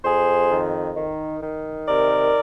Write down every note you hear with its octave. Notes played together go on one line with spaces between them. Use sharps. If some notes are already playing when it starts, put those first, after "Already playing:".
F2 G#4 C5
D#3
D#3
D#3
C3 A#4 D5